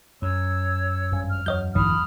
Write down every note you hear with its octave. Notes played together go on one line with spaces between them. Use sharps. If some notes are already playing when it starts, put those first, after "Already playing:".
F#2 C#5 E6
G#1 G2 C#4
F6
E2 F#3 C#5 D#5 G6
A1 D2 G2 E3 B5 D#6 F6